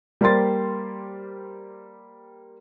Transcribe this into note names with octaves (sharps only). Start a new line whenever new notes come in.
G3 A#3 G4 C5 C6 A6